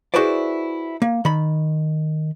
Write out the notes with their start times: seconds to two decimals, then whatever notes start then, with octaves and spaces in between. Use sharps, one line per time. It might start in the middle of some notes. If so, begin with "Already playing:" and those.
0.14 E4 F#4 G#4 B4 C5 D5
1.02 A#3
1.25 D#3 B5